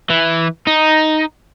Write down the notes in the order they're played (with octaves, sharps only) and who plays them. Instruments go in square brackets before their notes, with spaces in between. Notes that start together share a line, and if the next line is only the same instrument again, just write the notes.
[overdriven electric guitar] E3
D#4